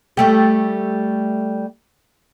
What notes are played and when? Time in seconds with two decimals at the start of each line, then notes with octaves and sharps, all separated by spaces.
0.17 G3 A3 G4